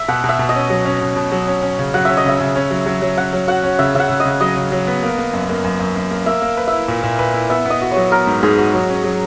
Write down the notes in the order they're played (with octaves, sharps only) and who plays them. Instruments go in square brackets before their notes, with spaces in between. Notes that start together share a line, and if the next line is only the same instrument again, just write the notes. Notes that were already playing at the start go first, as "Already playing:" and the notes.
Already playing: [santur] E5
[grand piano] B2 [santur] F#5
[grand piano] B2
[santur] E5
[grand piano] B2
[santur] D#5
[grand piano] C#4
F#3
C#4
B2
B2
F#3
C#4
C#4
C#3
[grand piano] F#3 [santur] F#5
[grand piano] C#4 [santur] E5
[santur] D#5
[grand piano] C#3 [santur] E5
[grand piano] C#3
C#4
F#3
F#3
F#3
[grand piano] C#4 [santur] F#5
[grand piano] F#3
[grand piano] F#4 [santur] F#5
[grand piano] C#4
[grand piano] C#3 [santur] E5
[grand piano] C#3 [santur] E5 F#5
[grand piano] C#3
[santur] D#5
[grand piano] C#3
[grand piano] F#3 [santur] D#5
[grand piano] C#3
F#3
B3
A#3
A#3
F#2
A#3
F#2
F#2
F#2
A#3
[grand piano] A#3 [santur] E5
[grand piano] A#3
B4
[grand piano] E4 [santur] E5
[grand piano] A#2
A#2
B4
E4
[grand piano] B3 [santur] E5
[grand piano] B3 [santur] D#5
[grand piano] F#4
[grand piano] F#3 [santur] C#5
[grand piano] B3 [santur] A#4
[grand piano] G#2
[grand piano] G#2 [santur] G#4
[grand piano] F#4
F#3
C#4
F#3